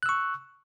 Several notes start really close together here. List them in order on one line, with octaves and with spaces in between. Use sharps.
F#6 E6 C#6